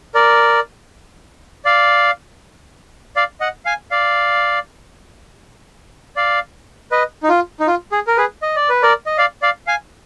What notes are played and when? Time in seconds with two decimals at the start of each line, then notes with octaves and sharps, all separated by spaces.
0.15 A#4 D5
1.65 D5 F5
3.16 D5 F5
3.40 D#5 F#5
3.65 F5 G#5
3.91 D5 F5
6.16 D5 F5
6.91 B4 D#5
7.23 D#4
7.29 F4
7.60 D#4
7.67 F4
7.92 G#4
8.07 A#4
8.17 G#4 B4
8.42 D#5
8.56 D5
8.69 B4
8.82 A#4 D5
9.06 D#5
9.18 D5 F5
9.42 D5 F5
9.67 F5 G#5